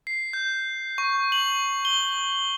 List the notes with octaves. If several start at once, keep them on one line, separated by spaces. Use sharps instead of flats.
C7
G6
C#6
F#7
G7